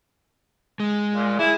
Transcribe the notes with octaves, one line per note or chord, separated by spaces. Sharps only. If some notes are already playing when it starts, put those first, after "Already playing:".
G#3
A#2
E4 G#4